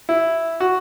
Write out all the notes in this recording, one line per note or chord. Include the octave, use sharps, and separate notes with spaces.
E4
F#4